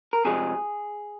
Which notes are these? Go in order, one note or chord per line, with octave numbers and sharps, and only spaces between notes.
A#4
F2 C3 F3 G#3 G#4